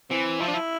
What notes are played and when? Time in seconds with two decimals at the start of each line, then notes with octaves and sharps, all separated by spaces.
0.10 E3 C4
0.40 F3 E4
0.48 D4
0.54 E4